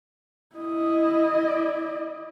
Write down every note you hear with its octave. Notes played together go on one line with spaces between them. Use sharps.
E4 D#5